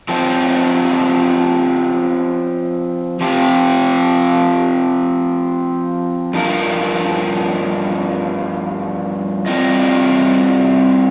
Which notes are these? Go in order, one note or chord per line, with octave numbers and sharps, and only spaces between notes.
F3 C4 D#4
F3 C4 G4
G2 F3 D#4 A#4
G3 C4 F4 D#5